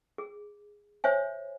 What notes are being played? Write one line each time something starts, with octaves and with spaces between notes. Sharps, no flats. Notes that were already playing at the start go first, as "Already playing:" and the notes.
G#4
C5 C#5 E5 G#5